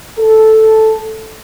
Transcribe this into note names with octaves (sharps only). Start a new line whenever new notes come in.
A4